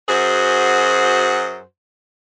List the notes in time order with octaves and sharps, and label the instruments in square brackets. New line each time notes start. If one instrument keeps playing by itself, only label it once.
[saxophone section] F#2 F#4 G#4 C5